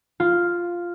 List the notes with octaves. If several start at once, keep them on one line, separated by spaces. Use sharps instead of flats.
F4